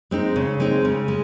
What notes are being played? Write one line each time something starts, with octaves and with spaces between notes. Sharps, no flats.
G#3 C4 D#4
C#3
G#3 C4 D#4
C#3
G#3